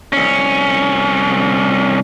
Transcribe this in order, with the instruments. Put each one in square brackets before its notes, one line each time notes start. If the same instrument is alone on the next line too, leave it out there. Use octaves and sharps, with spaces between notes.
[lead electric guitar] C2 C#4